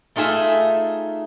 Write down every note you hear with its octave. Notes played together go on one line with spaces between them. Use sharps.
A3 D#4 F4 G#4 E5